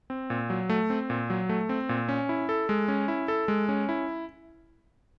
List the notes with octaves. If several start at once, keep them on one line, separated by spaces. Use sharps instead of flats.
C4
A#2
F#3
A3
C4
A#2
F#3
A3
C4
A#2
C#4
E4
A4
G#3
C#4
E4
A4
G#3
C#4
E4